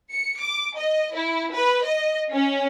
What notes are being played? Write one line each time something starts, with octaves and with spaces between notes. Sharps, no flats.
C#7
D6
D#5
E4
B4
D#5
C#4